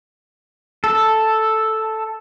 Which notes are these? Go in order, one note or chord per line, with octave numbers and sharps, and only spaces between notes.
A4